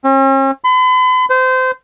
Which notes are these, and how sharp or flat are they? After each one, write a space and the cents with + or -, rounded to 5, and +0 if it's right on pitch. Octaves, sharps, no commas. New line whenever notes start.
C#4 -45
B5 +45
C5 -25